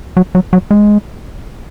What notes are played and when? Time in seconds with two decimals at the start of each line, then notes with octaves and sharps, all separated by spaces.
0.17 F#3
0.35 F#3
0.53 F#3
0.71 G#3